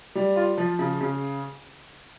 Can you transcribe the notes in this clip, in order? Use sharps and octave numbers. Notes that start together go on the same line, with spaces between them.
G3
F4
F3
C#3
C#3